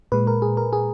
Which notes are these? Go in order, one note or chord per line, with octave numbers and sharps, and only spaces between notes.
A#2 G#3 B4
A#4
G#4
A#4
G#4